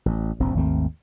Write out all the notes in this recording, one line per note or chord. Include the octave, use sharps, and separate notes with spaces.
A1
F1 A#1 E2 C4
G#1 D#2 A3 C4